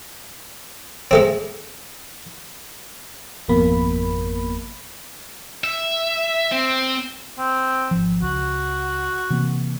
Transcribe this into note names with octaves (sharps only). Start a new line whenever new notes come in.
G#3 A3 C4
G#1 F2 B2 A#3 B5
E5
C4
C4
G#1 F3
C#2 F#4
C3 E3 A#3